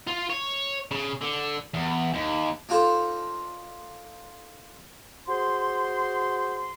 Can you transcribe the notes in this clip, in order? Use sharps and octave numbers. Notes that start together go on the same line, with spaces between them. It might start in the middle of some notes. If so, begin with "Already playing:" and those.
F4
C#5
C#3
D3
E2
D#2
D4 D#4 F4 A4 C5
F#4 G#4 C5 C6